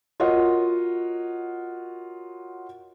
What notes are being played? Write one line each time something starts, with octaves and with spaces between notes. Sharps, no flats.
F4 F#4 A#4 C#5 D#5 F#5